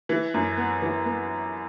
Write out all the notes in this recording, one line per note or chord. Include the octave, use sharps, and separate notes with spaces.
E3
F#2
B3
E3
B3